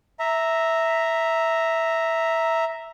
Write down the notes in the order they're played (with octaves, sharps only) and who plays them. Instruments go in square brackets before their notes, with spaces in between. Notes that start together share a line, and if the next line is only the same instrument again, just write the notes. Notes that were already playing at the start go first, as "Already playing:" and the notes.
[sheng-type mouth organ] E5 A#5